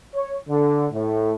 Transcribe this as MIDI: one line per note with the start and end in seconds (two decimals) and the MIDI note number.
0.14 0.34 73
0.48 0.86 50
0.91 1.33 45